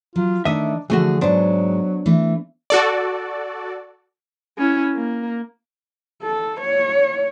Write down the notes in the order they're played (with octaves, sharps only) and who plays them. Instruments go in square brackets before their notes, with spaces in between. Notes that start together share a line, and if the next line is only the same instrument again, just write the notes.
[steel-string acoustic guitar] F#3 [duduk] F4
[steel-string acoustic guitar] D#3 A3 [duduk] D4 [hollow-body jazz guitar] D#5 E5
[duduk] D3 [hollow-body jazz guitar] E3 A3 F#4 [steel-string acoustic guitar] F3 G#4
[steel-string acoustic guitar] G#2 G#3 [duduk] F#3 [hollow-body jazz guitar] B3 D4 C5
[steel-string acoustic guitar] E3 A3
[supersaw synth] F#4 A4 D5
[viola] C#4 E4
A#3
[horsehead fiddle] A4
C#5